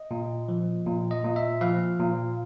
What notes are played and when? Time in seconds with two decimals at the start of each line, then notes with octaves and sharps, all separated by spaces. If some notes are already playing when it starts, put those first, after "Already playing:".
Already playing: D#5
0.11 A#2
0.48 F3
0.86 A#2
1.11 D#5
1.24 A#2
1.36 E5
1.61 F3 F5
1.99 A#2